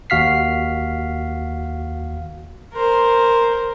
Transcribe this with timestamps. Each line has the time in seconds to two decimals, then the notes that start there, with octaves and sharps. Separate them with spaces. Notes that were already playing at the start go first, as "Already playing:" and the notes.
0.10 D#2 F#4 F5 F6 B6 C7
2.73 A#4 C5